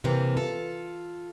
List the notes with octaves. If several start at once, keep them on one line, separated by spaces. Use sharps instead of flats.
C3 E3 A#3 C4
F4 A4